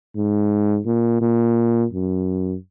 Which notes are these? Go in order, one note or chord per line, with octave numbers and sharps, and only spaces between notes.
G#2
A#2
A#2
F#2